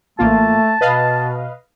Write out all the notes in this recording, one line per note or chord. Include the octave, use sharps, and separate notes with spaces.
A1 A3 A#3 F4 A5
B2 B4 D#5 F5